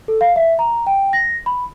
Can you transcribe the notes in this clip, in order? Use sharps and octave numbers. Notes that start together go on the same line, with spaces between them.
A4
F5
E5
A#5
G5
A#6
B5